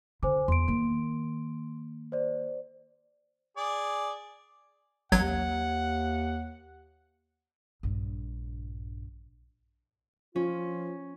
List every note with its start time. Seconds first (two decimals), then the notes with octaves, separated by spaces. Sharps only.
0.23 D3 C5 G#5 D6
0.48 E2 C6 D7
0.68 D#3 A#3
2.12 C5 D5
3.57 G#4 D5
5.12 A1 D#2 F#3 F#5 G#6
7.83 A#1 G2
10.36 F3 C#4 F4